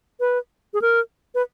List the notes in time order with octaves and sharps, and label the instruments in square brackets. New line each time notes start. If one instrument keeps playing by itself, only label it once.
[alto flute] B4
G#4
A#4
B4